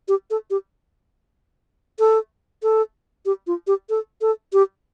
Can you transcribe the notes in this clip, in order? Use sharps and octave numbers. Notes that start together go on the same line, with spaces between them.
G4
A4
G4
A4
A4
G4
F4
G4
A4
A4
G4